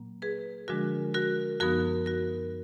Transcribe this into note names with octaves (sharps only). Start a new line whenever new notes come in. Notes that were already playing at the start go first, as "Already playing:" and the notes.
Already playing: A#2 F#3 A#3
G#4 B4
D3 F3 G#3 D4 F#4 A#4
F#4 A#4
F#2 F3 B3 D#4 F#4 A#4
F#4 A#4